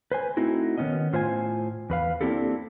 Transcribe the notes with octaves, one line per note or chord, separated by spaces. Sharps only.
B4 C5 G#5
A3 C4 D#4 E4 F#4
D#3 G3 B3 C#4 D#5
A2 F4 C5 E5 G#5
E2 B4 F5
A#3 C4 D4 E4 G4 A4